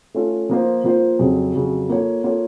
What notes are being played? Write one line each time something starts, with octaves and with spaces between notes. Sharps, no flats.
A3 C#4 F4 A4
F3 A#3 F4 C5
F3 A#3 F4 C5
F2 C#3 F#3
F2 C#3 F#3
A#3 F4 A4 C#5
A#3 F4 A4 C#5